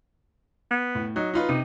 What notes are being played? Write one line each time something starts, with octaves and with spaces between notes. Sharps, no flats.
B3
A2
F#3 D#4
D#4 F4 B4
C3 D#4